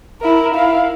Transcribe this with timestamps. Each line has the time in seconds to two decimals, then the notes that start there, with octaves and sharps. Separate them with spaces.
0.21 E4 A#4
0.54 E4 F5